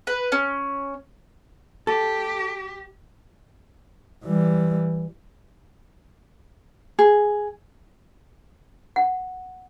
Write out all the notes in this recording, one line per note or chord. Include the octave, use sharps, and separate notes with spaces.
B4
C#4
G4 A4
E3 G3
G#4
F#5